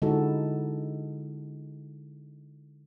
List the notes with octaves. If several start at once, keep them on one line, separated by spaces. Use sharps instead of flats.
D3 G#3 D#4 E4 F#4 A4